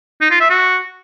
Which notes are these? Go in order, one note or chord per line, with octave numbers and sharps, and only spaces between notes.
D#4
F4
E5
F#4